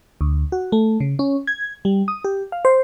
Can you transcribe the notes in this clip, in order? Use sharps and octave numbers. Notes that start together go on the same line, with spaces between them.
D2
F#4
A3
C#3
C#4
G#6
G3
D#6
G4
F5
C5